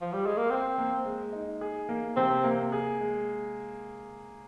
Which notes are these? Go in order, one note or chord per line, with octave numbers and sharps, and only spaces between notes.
F3
G3
G#3
A#3
C4 C5
A#3
G#3
D#4
G#4
A#3
C3 C4
A#3
G#4
G#3